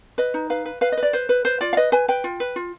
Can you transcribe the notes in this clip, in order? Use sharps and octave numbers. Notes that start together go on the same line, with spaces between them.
B4 D#5
D#4
B4 F5
B4
B4 F5
D#5
B4
D5
B4 C5
B4
B4 C5
F4 D5
F5
B4 D#5
B4 G#5
B4 G5
F4
B4
F4